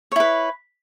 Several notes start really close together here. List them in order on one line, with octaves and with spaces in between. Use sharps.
C#5 E4 B4